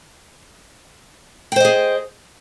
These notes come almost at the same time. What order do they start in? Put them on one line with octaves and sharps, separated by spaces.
G5 C5 D#5 G#4